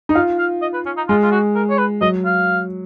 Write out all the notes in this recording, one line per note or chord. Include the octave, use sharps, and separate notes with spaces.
D#4
F4 F5
F5
D#5
B4
C#4
D#4
G#3 F4
F4
F#4
A#4
C#5
B4
F#3 D#5
F5